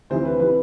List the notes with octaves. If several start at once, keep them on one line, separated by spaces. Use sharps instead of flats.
D2 C3 E3 C5
B4
C3 E3 B4